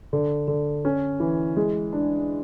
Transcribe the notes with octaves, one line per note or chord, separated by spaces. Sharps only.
D3
D3
C#4
E3
G#3
D4